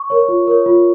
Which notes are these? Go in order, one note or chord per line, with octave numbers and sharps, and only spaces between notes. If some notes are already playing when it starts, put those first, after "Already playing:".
Already playing: C#6
A#4 C#5
F4
A#4 C#5
F4